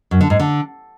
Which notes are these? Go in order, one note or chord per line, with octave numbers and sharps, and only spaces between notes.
F#2
D3
G#2
D3